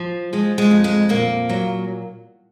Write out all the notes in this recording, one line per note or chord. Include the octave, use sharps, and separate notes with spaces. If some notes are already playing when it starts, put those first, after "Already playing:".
Already playing: F3
F3 G#3
G#3
F2
G#3
A#2 A#3
F#3